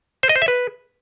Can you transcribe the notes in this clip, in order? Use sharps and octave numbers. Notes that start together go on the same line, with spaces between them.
C5
D#5
C5
E5
B4